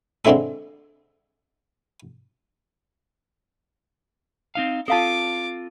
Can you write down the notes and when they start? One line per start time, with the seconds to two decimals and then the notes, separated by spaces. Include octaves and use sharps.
0.25 D3 G#3 C4 D4 E4 A4
4.55 C4 D#4 F5
4.88 C4 F4 A4 F5 A5 D6